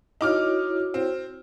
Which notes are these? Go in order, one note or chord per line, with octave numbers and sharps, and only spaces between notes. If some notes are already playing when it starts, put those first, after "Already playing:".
D#4 E4 F#4 C#5 D6 F6
C4